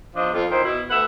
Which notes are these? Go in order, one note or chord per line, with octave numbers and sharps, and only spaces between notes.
E2 F3 D4 D#5
F2 F4
A#2 D#3 E4 C5
B2 E4
D2 B4 E5 F#5